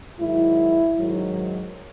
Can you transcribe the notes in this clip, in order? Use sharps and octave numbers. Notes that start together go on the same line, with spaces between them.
G#2 D#3 F#3 E4
G#2 D#3 F#3